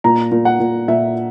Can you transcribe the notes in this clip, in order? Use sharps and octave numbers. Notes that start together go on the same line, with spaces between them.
A#2 A#5
A#2
F#5
A#2
A#2 E5